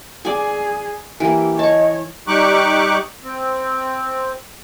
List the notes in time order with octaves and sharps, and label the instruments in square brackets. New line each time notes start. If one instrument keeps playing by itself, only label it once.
[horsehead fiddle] G#4 [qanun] D5 G#5
[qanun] E3 A#3 [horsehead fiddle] G4
[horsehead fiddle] C#5 [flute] D#5 [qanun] A5 C#6
[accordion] G3 D#4 G4 C#6 D6 F#6
C4